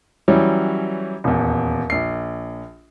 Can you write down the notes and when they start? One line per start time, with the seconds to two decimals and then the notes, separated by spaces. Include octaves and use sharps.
0.28 E3 F#3 G3 C#4
1.24 D#1 E2
1.90 A#1 C7